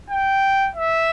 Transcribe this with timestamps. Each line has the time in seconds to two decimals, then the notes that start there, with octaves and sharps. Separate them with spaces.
0.10 G5
0.76 E5